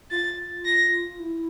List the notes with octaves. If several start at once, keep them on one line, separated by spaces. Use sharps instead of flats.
F4 A6
A#6
E4